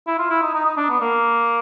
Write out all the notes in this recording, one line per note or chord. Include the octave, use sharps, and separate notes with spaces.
E4
F4
E4
D#4
D#4
D#4
D4
B3
A#3